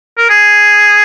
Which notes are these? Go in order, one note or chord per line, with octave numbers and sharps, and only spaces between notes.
A#4
G#4